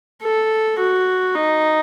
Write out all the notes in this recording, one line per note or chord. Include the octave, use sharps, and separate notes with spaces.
A4
F#4
D#4